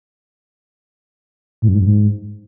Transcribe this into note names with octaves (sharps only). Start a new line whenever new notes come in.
A2
F#2
G#2
F#2
G#2